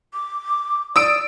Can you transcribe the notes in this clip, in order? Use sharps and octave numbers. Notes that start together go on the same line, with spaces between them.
D6
D5 D#6 E6 D7